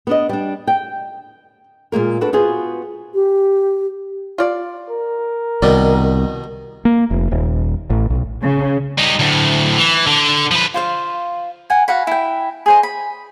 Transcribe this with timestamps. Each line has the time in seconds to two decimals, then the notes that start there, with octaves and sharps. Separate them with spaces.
0.07 B3 D4 D#5
0.29 G3 D4
0.67 G5
1.92 A#2 G#3 A#3 A#4
2.21 D4 F#4 A4 B4
2.33 B3 F4 F#4 G#4 C5
3.14 G4
4.38 F4 D5
4.90 A#4
5.62 C2 B2 D#3 D5
6.85 A#3
7.10 F1
7.31 D#1
7.90 A1
8.10 B1
8.43 C#3
8.98 G3 D#4
9.19 D2 A2
9.77 E3
10.07 D3
10.51 F3 B4
10.74 F4 C5 F5
11.70 F#5 G#5
11.88 F#4 F5 F#5 B5
12.07 E4 G5
12.66 G#4 C5 D#5
12.83 B5